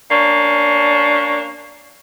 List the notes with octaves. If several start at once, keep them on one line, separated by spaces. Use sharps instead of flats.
A#3 C#4 D4